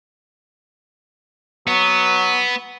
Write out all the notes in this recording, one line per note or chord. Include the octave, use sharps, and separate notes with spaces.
F#3 B3